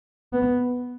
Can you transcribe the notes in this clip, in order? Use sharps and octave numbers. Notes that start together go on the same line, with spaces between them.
B3